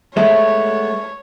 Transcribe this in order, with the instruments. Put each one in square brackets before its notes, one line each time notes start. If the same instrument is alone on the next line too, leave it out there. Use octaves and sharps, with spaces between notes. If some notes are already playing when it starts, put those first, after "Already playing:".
[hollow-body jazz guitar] G#3 A3 B3 [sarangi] C#5 [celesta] E5